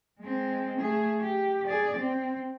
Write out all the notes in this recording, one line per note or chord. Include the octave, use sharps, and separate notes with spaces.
G#3 C4
A3 G#4
G4
G#4 D5
C4